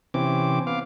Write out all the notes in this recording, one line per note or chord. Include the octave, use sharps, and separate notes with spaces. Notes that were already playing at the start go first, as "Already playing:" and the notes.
C3 E3 C4 C#4 D6
B3 F5 D6